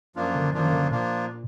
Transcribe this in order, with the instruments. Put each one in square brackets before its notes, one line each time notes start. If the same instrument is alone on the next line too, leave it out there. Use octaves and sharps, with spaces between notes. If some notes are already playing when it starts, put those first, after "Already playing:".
[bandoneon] F#2 F3 A#3 D4 F4
[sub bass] D3
[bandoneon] F#2 F3 A#3 D4 F4 [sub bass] D#3
[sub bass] D3
[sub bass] A#2 [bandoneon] F3 A#3 D4 F4